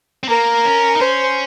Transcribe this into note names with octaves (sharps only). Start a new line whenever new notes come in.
C4
A#3 A#4
C#4
D#4
C#4 C5